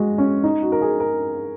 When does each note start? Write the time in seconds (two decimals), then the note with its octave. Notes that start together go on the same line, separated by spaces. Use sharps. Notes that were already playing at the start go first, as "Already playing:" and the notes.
Already playing: G#3 F#4
0.18 C#4
0.44 D#4
0.62 F#4
0.72 A#4
0.81 G#4
1.00 A#4